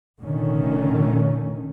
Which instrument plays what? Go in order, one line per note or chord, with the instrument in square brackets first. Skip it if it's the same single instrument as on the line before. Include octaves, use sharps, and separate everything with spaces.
[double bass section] F1 A#2 D3 D#3 A3 C#4